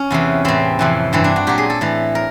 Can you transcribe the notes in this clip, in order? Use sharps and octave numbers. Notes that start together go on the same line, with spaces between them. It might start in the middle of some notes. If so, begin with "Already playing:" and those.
Already playing: C#4
E2 C3 E3
A2 E3 C4
F2 C3 E3
G2 E3 C4
D4
F#4
A#2 F#3 G4
G#4
A4
A2 E3
A#4